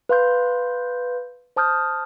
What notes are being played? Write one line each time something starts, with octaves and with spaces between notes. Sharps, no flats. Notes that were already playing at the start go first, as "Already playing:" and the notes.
B4 F5 C6 G6
C5 A5 D#6 F6 G6